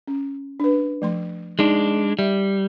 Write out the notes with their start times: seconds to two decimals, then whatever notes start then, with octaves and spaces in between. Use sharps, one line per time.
0.08 C#4
0.60 D4 B4
1.02 F3 A3 C6
1.59 G#3 D4 D#4
2.19 G3 E5